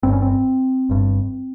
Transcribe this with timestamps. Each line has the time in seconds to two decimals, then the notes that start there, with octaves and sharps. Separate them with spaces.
0.03 G1 G2 C4
0.13 C#4
0.22 C4
0.89 G1 G2